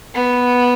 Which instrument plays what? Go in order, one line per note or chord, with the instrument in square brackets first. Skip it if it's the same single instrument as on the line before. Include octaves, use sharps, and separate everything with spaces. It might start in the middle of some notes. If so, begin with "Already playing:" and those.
[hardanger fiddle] B3